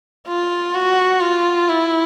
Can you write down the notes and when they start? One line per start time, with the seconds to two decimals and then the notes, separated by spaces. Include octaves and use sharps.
0.27 F4
0.75 F#4
1.21 F4
1.69 E4